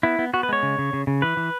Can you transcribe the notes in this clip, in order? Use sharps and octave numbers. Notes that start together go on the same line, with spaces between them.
B3 E4
B3
B3 F#4
B4
G#3 C#5
C#3
C#3
C#3
C#3
E3 B4
E3